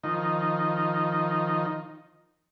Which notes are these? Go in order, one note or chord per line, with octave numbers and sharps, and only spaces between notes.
D#3 F3 D#4